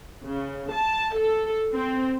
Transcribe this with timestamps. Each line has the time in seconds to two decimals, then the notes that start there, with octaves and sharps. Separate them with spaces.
0.25 C#3
0.73 A5
1.17 A4
1.74 C4